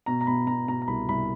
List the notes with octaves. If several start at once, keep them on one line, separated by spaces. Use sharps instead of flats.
B2 A#5
A#5
B2 B5
B2 A#5
B2 A#5
A#5
C2 B5
C2 B5